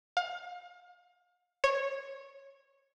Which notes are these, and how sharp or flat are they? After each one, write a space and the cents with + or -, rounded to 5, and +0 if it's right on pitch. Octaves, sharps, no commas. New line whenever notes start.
F5 +35
C#5 -15